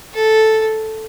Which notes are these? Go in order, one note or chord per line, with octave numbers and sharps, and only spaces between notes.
A4